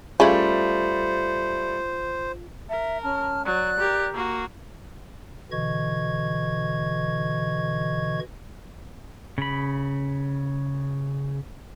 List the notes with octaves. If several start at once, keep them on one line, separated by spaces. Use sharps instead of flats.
C#3 G3 A3 E4 F4 C5
A#4 E5
C#4 A5 F6
F#3 D5 F#6
G4 A#4
A#3 F#4
B2 D3 E3 D#5 C#6 G#6
C#3 B5